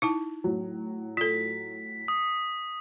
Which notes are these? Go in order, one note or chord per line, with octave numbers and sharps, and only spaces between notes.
D#4 E4 A5
A2 F#3
F4 A4 B6
D#6